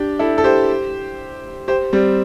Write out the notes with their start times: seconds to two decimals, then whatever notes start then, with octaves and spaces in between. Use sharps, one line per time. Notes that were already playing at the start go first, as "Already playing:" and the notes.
Already playing: D4 G4
0.19 E4 A4
0.38 A4
0.44 G4 C5
1.68 G4 C5
1.93 G3 C4